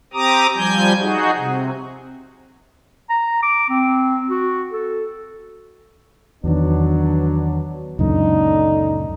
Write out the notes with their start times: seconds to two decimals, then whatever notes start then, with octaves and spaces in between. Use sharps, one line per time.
0.13 C4 G4 A#5 D6 D#6
0.55 F3 G3 G#5 G6
1.00 D#4 F#4 G#4
1.37 C3
3.10 A#5
3.43 D6
3.69 C4
4.30 F#4
4.71 A4
6.44 E2 D#3 F#3 B3 D4
7.99 C#2 F#2 A#2 D3 D#4